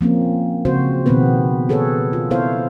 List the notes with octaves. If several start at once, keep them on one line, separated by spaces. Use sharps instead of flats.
F3 A#3 C4 C#4
C#3 C4 F#4 C5
B2 D#3 F3 B3 C4 B4
G#4 A4 B4 C#5
F4
B3 E4 A4 C5 C#5 F5